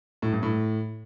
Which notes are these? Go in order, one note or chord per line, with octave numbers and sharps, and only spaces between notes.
A2
G2
A2